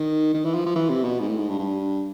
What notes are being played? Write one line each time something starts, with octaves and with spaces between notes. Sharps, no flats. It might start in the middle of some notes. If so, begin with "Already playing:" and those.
Already playing: D#3
D#3
E3
F3
F3
E3
C3
B2
G#2
A2
G#2
G2
G2